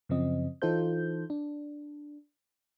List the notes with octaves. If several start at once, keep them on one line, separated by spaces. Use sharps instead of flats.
F#2 C#3 F3 C4 D#5
E3 D#4 F4 A4 C5 G6
D4